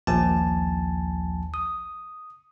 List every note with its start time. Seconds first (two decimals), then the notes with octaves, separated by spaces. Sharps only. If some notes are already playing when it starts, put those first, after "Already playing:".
0.07 A#1 D#2 F3 G#5 A5
1.54 D#6